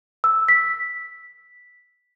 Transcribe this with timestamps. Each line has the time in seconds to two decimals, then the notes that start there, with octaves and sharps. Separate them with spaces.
0.24 E6
0.48 B6